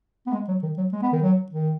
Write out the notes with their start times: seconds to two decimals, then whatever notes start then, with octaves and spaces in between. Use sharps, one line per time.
0.27 B3
0.33 G#3
0.48 F#3
0.63 D#3
0.78 F#3
0.93 G#3
1.03 B3
1.13 D#3
1.23 F#3
1.52 D#3